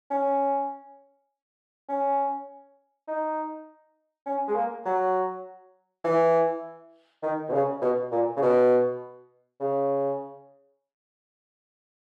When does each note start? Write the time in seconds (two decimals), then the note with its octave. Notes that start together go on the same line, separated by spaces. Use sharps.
0.11 C#4
1.89 C#4
3.08 D#4
4.26 C#4
4.48 G#3
4.55 A#3
4.86 F#3
6.04 E3
7.23 D#3
7.49 B2
7.53 C#3
7.82 B2
8.12 A#2
8.37 C#3
8.42 B2
9.60 C#3